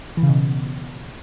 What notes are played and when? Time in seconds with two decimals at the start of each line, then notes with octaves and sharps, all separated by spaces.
0.17 E3
0.23 C#3
0.28 B2